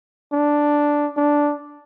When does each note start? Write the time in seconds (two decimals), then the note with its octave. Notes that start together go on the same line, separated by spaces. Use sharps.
0.33 D4
1.17 D4